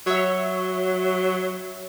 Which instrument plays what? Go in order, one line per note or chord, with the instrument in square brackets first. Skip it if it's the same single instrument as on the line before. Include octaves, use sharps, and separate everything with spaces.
[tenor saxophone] F#3 [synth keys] C#5 E5